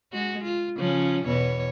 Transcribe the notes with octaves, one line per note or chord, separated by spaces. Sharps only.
G#3 F#4
F4
C#3 F3 C#4
E2 B2 C#5